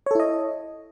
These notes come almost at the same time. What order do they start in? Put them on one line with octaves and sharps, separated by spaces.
C#5 A4 E4 D#5